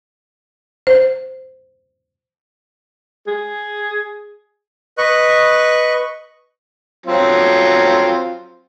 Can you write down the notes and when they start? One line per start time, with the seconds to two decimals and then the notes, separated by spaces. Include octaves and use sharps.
0.87 C5
3.27 G#4
4.98 B4 D#5 C#6 F#6
7.06 F#3 C4 F4